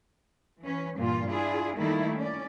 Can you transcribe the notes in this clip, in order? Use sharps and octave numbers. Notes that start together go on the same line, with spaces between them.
E3 C#4 B4
G2 A#2 E3 A#3 F4
D4 E4 F4 G#4
D#3 G3 A3 A#3 D#4 E4
C#4 D5